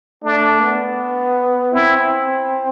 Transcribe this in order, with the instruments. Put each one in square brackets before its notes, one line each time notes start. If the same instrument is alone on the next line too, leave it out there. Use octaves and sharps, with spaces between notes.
[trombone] A3 [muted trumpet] D4
[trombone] B3
[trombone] C4 [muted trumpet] E4